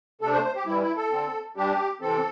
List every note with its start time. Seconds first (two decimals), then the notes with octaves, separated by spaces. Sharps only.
0.21 C3 A3 D4 A4
0.33 C5
0.44 C5
0.56 G4
0.66 G2 E3 G3 E4
0.81 E4
0.96 A4
1.11 D3 C4
1.56 G2 G3 D4 G4
2.01 C3 E3 C4 A4